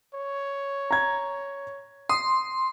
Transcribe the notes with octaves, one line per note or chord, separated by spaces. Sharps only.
C#5
A#5 G#6
C6 D#6